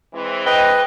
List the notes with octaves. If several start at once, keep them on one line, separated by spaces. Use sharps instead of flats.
E3 G#3 C4
B4 D#5 G5